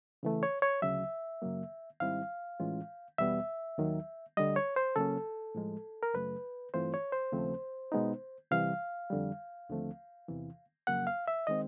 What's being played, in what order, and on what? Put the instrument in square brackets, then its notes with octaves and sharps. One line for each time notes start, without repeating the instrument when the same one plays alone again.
[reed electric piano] C#3 E3 A3
C#5
C#5
D2 C#3 F#3 E5
F#2 C#3 F#3 A#3
G#2 D#3 G3 C4 E4 F5
A2 E3 G#3 C#4 F4
E2 B2 G3 B3 E5
D#2 D#3 F#3
D2 D3 G3 D#5
C#5
C5
C#3 F#3 A#3 C#4 A4
A2 F3 G#3
A#4
F#2 C#3 F#3 A3 B4
G2 E3 A3 C4 F4 C5
C#5
C5
D#2 C#3 F3 A3 C4
B2 G#3 B3 D#4
C3 E3 G3 F5
F2 D3 G3
D#2 D3 F3 A3 C4
E2 C3 E3
F2 C#3 F#3 A#3 F#5
F5
E5
D#3 G#3 C4 D#5